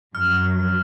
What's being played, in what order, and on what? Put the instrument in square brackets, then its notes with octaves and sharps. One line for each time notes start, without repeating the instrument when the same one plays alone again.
[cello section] F#2 F#3 [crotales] F6